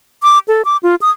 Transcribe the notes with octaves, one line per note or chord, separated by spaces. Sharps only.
D6
A4
D6
F4
D#6